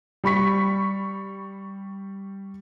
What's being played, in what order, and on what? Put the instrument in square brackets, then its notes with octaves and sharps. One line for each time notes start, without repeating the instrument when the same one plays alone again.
[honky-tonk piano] G3 B5 C#6 B6